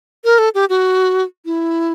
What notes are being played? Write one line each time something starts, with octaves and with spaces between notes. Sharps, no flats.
A#4
A4
G4
F#4
E4